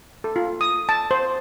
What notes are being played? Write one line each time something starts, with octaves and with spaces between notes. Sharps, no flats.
A4
F4
D#6
A5
C5